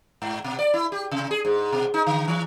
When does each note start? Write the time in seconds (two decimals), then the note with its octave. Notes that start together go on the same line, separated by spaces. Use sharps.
0.22 G#2
0.44 B2
0.59 D5
0.74 E4
0.92 G4
1.11 C3
1.31 G#4
1.45 G#2
1.72 B2
1.94 D#4
2.07 D3
2.28 E3